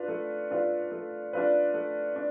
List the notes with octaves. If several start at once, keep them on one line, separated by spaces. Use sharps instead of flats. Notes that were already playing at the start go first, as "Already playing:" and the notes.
Already playing: D4 F4 B4
A3
D4 F4 B4
A3
D4 F4 B4
A3
D4